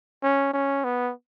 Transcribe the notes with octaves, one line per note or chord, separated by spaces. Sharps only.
C#4
C#4
B3